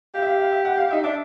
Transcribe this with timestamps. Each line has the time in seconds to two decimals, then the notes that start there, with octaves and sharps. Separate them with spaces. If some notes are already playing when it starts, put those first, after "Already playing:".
0.14 G4 F5
0.22 E5
0.26 F5
0.40 F5
0.52 E5
0.65 F#5
0.77 F5
0.91 D#4 E5
1.04 D4 E5